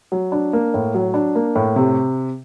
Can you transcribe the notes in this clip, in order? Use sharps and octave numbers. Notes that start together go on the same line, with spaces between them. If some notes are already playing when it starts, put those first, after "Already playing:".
F#3
D4
A#3
A2
F#3
D4
A#3
A2
C3